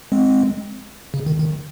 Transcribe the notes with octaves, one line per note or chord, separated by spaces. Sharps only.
G#3 C4
C#3
D#3
D#3